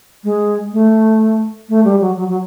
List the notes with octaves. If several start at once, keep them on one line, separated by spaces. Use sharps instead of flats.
G#3
A3
A3
G3
F#3
F#3
F#3